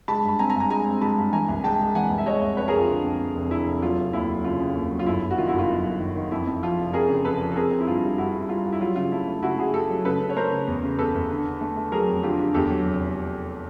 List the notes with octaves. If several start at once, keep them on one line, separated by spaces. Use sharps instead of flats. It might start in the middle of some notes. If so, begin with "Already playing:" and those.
G#3 A5 B5
G2
B5
C4 G#5 A#5
G#5 A#5
G2
G#5 A#5
G#3 G#5 A#5
C4
G#3 A5 B5
G2
E3 G#5 A#5
C2
G#3 G5 A5
G#3
E3 F#5 G#5
C2
E5
G#3 C#5 D#5
C2
F2 B4 C#5
G#4 A#4
F2
F4
D3
F2
F2
F1
D3 E4
F1
F#3 F4
F1
D#2 E4
F#3
C#3 F4
C#3
D#2
F#3
F4
G1 E4
G1
F#4
D#3 F4
E4 F#4
G1
F4
F#2
G1
D#3
D#3
F2 E4
F2
F3 F4
F1
F2 G#4 A#4
C#3
F1 A4 B4
F3
A4
C4 G#4 A#4
C4
E4
G2 F4
G3
G2 E4 F#4
G2
E4
G3 F4
G3
E4
F#3 F4
C#3 F4
A3 E4
A3
C#3 E4 F#4
C#3 F#4 G#4
A3 G4 A4
F#3
C#3 A4 B4
C#3
C#5
A3 A#4 C5
C#3
E2
C#3
E2 A4 B4
E2
D3
D3
A3
A3
F#3 G#4 A#4
F2
D3 F4 G4
D3
E2 G4 A4
F#3
F1
F1